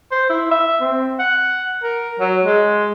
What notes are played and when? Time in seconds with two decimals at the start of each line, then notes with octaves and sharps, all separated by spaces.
0.12 C5
0.29 E4
0.52 E5
0.81 C4
1.20 F#5
1.83 A#4
2.20 F#3
2.45 G#3